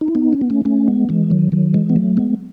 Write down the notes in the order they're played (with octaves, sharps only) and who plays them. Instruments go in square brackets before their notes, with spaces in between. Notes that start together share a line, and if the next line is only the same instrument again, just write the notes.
[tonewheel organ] D#4
E4
B3 D#4
C#4
B3
A3 C#4
A3 C#4
G#3 B3
E3 G#3
D#3 F#3
D#3 F#3
E3 G#3
B3
F#3 A3
G#3 B3